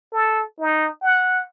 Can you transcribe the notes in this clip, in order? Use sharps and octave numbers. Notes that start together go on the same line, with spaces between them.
A4
D#4
F#5